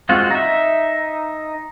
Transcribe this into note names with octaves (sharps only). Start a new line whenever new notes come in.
G#3 C4 F4 F#4
D#4 E5